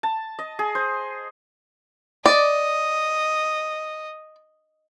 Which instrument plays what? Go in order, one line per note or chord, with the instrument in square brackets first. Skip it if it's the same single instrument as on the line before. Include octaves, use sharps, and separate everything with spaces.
[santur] A5
D#5
G#4
C5
[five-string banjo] D5 [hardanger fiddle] D#5